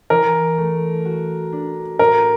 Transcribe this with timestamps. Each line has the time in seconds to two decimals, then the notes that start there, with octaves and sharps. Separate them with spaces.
0.10 E3 A#4
0.58 A3
1.05 F#4
1.52 D4
1.99 A2 A#4